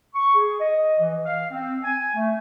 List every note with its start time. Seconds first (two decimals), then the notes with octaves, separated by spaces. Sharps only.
0.14 C#6
0.35 G#4
0.60 D#5
0.99 E3
1.25 F5
1.50 C4
1.84 G#5
2.15 A3